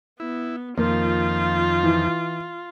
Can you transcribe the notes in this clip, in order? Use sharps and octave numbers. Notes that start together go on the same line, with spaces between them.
B3 E4
F2 D#3 F3 A#3 F4
E3